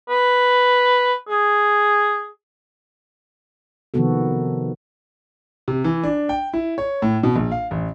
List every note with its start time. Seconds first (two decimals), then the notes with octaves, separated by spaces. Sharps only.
0.09 B4
1.29 G#4
3.94 C3 D#3 F3 B3 F#4 A4
5.68 C3
5.84 E3
6.04 D4
6.29 G5
6.53 E4
6.78 C#5
7.02 A2
7.23 B2
7.36 A#1
7.52 F5
7.71 A1